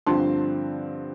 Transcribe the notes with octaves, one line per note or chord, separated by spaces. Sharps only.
G2 D3 F3 C4 A5 C6